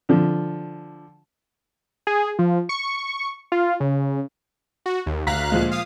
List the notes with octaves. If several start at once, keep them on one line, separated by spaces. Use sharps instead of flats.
D3 F3
G#4
F3
C#6
F4
C#3
F#4
D#2
D2 F5 A#5 F#6 B6
A#2 F3 G#3
F5 D#6